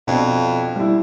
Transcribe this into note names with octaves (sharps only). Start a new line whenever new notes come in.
F2 B2 C4 D4
G3 E4